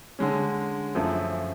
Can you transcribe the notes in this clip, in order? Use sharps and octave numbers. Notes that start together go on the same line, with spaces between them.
D3 G#3 C#4
F#2 F3 A3